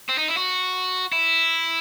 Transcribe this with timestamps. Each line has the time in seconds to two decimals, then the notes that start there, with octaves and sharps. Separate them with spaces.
0.09 C4
0.18 D#4
0.28 E4
0.37 F#4
1.12 E4